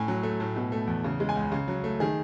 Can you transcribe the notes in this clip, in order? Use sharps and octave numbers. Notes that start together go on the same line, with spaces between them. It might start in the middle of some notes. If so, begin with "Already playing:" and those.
Already playing: A2 G#5
F#3
A3
A2
B2
A3
E2
C#3
G#3
G#5
C#2
C#3
F#3
A3
D#3 G#4